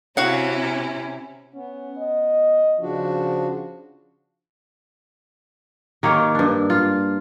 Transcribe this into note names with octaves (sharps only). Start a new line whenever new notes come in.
C3 C#4 E4 F#4 F5 F#5
B3 C#4
D#5
C#3 F3 D4 F#4
D#3 A#3 G4 C#5
G2 D4
F4